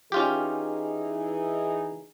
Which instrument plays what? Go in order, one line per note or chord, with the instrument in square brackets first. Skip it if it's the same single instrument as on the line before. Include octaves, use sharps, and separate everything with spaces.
[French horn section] E3 D#4 G#4 [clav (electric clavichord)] C#4 F4 G4